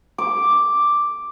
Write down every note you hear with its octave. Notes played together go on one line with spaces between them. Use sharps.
D6